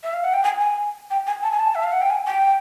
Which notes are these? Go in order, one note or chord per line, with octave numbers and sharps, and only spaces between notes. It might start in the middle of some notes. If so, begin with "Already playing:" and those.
E5
F5
F#5
G5
G#5
G#5
G5
G#5
A5
G#5
A5
E5
F5
F#5
G5
G#5
G5